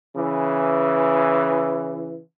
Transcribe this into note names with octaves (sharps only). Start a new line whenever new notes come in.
C#3 E3